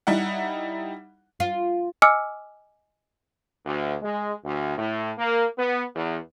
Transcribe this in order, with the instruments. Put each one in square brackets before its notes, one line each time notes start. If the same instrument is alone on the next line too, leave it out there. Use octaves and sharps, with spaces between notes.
[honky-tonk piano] G3 D#4 E4 F#5
[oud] F4
[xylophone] D#5 G#5 D6 E6 F6 C#7
[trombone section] D2
G#3
D2
A2
A#3
B3
E2